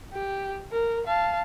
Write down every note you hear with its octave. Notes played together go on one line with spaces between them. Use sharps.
G4
A#4
F5 A5